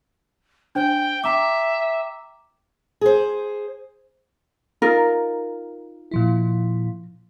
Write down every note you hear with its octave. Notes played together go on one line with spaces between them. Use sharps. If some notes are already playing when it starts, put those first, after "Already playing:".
D4 C5 G5
E5 G5 A#5 D6
G#4 C5
D#4 F4 A#4
A#2 F3 E4